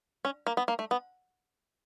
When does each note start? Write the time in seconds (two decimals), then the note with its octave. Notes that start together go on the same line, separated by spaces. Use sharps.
0.25 C#4
0.47 A#3
0.57 B3
0.68 A#3
0.79 A3
0.91 B3